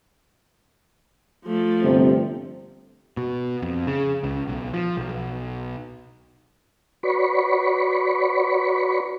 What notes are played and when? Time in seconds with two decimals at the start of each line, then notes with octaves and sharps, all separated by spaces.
1.45 F3 A3
1.81 G1 C3 C4
3.17 B2
3.62 F2
3.87 C#3
4.23 C#2
4.48 B1
4.73 F3
4.97 B1
7.03 F#4 B4 C#5 D5 B5 C#6